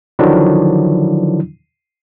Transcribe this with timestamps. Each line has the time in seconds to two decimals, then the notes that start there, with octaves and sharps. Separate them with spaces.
0.19 D3 D#3 F3 F#3 D4 E4